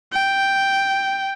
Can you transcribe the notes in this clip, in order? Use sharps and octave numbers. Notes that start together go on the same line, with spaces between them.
G5